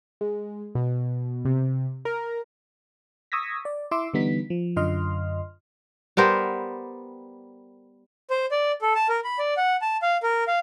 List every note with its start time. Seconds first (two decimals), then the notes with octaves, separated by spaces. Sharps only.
0.21 G#3
0.75 B2
1.45 C3
2.05 A#4
3.32 C#6 D#6 E6 G#6 A#6 B6
3.65 D5
3.91 E4 E5 C6 D6 E6
4.14 D3 E3 G3 B3 D#4 B6
4.50 F3
4.76 F#2 D3 F4 D#5 C6 F6
6.17 G3 B3 A#4 C5
8.30 C5
8.51 D5
8.82 A4
8.95 A5
9.09 A#4
9.24 B5
9.39 D5
9.57 F#5
9.81 A5
10.02 F5
10.23 A#4
10.48 F5